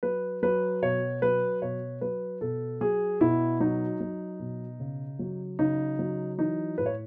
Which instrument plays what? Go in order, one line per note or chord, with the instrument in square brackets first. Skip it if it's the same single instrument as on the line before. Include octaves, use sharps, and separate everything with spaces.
[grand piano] F#3 B4
F#3 B4
B2 C#5
F#3 B4
B2 C#5
F#3 B4
B2 A4
F#3 G#4
B2 E4
F#3 D#4
F#3
B2
C#3
F#3
C#3 D#4
F#3
E3 D#4
A2 B4
C#5